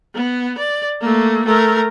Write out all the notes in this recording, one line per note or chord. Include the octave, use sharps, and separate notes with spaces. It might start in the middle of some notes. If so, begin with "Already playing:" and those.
B3
D5
A3 A#3
A3 A#4